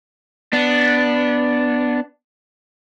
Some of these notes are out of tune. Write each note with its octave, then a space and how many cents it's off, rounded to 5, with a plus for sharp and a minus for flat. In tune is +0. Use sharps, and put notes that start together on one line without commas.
B3 +0 D4 +0